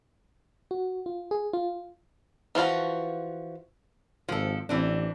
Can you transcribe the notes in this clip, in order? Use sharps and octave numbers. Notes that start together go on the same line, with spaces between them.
F#4
F4
G#4
F4
E3 F3 F4 F#4
G#1 F3 A4
A1 E3 C4 D4